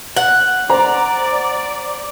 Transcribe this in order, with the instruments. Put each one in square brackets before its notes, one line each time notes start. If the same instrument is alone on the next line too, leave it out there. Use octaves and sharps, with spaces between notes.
[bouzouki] F#5
[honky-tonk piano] C5 A#5 [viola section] D5